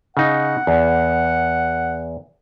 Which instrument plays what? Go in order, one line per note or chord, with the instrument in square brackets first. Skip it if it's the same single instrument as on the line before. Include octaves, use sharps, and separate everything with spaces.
[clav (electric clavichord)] C#3 D#4 [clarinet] F#5
[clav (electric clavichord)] E2